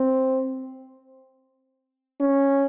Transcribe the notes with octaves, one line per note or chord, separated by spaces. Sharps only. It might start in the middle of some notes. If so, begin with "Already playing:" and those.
Already playing: C4
C#4